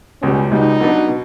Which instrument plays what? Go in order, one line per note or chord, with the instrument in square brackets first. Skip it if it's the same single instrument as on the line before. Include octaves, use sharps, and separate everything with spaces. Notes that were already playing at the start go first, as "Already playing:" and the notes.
[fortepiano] C#2 B2 G3 [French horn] C#4
[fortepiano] C#2 B2 G3 [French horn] D#4
[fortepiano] B2 F#3 B3 D4
B2